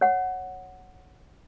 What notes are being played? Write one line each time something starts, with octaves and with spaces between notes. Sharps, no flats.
C#5 F#5